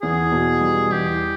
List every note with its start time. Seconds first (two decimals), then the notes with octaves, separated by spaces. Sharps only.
0.02 E2 G#4
0.32 B2
0.61 G3
0.91 E2 G4